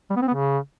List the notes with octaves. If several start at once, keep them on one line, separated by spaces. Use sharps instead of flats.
G3
B3
C4
B3
C#3